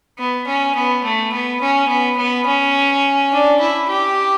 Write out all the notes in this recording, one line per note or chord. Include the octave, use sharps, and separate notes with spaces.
B3
C#4
B3
A3
B3
C#4
B3
B3
C#4
D4
E4
G4